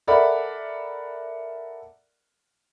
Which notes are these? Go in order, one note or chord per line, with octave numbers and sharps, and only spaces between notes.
A4 A#4 D5 E5 F#5 B5